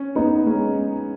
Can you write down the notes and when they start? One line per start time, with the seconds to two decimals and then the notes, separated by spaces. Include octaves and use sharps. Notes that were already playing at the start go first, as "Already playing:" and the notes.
Already playing: C#4
0.15 B3 D#4
0.46 G#3 C#4